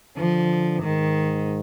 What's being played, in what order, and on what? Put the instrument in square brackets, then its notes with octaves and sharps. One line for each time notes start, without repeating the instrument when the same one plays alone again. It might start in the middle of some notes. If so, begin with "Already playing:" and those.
[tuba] D3 [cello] F3
[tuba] G#2 [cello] D#3